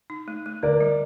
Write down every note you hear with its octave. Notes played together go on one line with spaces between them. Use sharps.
D#4
A3
A3
D3 A#4 D5
G3